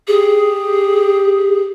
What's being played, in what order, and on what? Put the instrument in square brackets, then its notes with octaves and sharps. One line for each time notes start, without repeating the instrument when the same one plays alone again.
[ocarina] G4 [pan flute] G#4